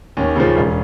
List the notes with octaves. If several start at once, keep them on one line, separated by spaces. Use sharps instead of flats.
D#2 C#4
C#3 F3
E1